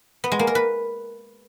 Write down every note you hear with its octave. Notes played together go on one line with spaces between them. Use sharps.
B3
G#3
A#3
A#4
B4